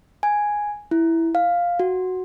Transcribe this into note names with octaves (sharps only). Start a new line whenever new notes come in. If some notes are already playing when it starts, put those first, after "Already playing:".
G#5
E4
F5
F#4